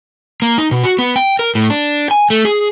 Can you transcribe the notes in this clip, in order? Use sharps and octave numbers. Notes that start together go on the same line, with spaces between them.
A#3
D#4
B2
F#4
B3
G5
A#4
A2
D4
G#5
A3
G#4